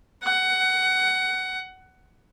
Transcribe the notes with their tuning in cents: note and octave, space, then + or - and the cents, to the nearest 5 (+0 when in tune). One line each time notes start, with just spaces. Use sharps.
F#5 +20